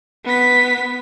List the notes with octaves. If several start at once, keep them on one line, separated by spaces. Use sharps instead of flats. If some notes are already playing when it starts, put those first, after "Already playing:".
B3 B6